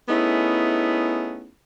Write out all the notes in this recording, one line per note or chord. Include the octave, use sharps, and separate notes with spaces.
A3 B3 C#4 D#4 E4 G#4